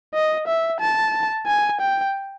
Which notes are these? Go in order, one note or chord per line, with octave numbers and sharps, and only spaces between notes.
D#5
E5
A5
G#5
G5